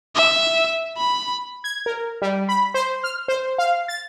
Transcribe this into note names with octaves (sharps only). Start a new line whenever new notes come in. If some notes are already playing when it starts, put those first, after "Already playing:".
E5
B5
G#6
A#4
G3
B5
C5
F6
C5
F5
A6